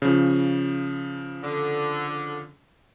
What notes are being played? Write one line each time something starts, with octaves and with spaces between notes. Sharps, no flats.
C#3 F3
D3